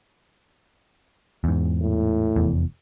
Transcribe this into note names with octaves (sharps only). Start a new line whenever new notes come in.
E2 G#2
A2
F1 E2